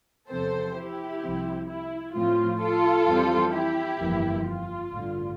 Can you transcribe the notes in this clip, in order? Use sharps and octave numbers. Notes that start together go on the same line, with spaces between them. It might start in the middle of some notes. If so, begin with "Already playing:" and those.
E2 C3 F3 C4 A4 C5
E4 G4
C2 C3 F3 C4
E4
A2 F3 C4 F4
F4 A4
F2 E3 G3 C4
E4 G4
G1 F2 E3 A#3
F4
A1 G2 D3